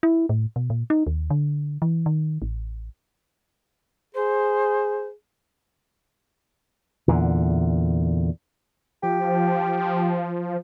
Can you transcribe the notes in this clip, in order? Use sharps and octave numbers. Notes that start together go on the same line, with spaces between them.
E4
A2
B2
A#2
D#4
D#2
D3
E3
D#3
A1
G#4 C5
E2 A#2 D3
F3 G4